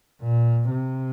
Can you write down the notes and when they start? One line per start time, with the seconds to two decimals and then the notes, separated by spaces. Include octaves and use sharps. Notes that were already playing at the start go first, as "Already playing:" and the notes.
0.22 A#2
0.70 C3